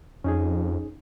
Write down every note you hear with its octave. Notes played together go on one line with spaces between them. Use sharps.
F2 C#4 D#4 G#4